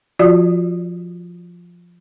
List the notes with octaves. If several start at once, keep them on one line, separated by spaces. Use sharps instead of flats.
F3 F4 F#4 D5